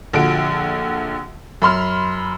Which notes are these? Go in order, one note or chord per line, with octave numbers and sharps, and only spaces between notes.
A#1 D3 F3 F#4 D7
F#2 B5 C6 F6